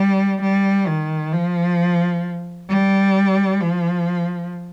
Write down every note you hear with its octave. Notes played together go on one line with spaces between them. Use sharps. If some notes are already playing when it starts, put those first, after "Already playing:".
Already playing: G3
G3
D#3
F3
G3
F3